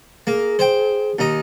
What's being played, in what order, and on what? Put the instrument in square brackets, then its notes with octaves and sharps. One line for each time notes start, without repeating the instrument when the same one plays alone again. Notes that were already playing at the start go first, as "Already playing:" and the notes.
[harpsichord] A#3 [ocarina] G#4
[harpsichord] C5 G5
D#2 D#4